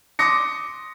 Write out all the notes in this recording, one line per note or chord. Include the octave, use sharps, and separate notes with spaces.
C6 D6 D#6 A#6 C#7